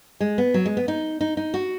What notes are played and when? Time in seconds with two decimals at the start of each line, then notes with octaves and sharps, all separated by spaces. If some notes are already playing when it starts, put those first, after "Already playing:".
0.20 G#3
0.38 B3
0.54 F#3
0.66 G#3
0.77 B3
0.88 D#4
1.21 D#4
1.37 D#4
1.54 F#4